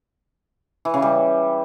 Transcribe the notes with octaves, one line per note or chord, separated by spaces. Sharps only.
E3
C#3
G3